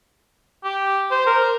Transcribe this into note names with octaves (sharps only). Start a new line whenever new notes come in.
G4
C5
A#4